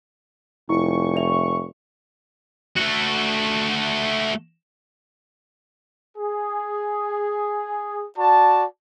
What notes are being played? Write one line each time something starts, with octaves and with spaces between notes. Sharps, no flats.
F1 E4 C#6
D5 E5 F7
A3 F#4
G#4
F#4 D5 A5